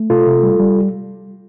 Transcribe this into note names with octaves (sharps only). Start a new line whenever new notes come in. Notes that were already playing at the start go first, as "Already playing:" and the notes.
Already playing: A3
C3 F4 A4
C3
G3
G3